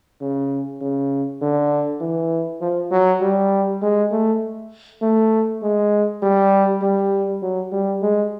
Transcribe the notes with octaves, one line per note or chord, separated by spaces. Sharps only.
C#3
C#3
D3
E3
F3
F#3
G3
G#3
A3
A3
G#3
G3
G3
F#3
G3
G#3